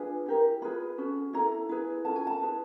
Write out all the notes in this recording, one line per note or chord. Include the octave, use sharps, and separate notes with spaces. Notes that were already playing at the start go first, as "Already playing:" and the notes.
Already playing: D4 F4 G#4 B4
E4 G4 A#4
F4 G#4 B4 B5
C#4 F#4 A4
E4 A4 A#5
E4 G#4 B4
C#4 F4 A4 A5
G#5
A5
E4 G#4 B4